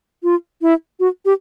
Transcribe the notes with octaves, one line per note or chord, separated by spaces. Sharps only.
F4
E4
F#4
G4